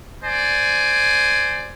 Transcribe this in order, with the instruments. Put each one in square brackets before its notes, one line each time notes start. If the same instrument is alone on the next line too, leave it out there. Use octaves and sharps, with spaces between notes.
[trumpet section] C5 D5 G#5